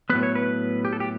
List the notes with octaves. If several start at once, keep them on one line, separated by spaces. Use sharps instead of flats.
A2 F#3 B3 B4
C#5
B4
G4
A4
G4